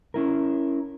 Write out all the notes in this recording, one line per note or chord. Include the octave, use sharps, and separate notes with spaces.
C#4 E4 A#4